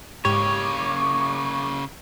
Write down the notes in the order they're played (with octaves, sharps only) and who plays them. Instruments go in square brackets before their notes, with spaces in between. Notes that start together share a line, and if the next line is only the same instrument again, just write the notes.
[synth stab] G#2 G4 [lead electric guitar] C#3 A#3 [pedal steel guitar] C#5 [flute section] C#6 D6